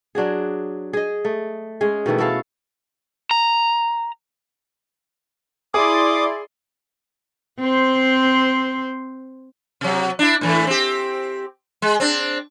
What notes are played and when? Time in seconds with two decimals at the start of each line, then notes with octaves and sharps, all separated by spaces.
0.15 F#3 D4 F#4 G#4
0.93 G#4 D#5
1.25 A3
1.81 G#3 C#4 G#4
2.06 B2 D#3 E3 A3
2.18 E4 F#4 A4 F5
3.31 A#5
5.74 E4 G#4 D5 C6 D6 D#6
7.60 C4 C5
9.81 C3 F#3
10.19 D4 E4
10.41 A2 E3 A3
10.67 C4 G4
11.82 G#3
12.00 C4 D4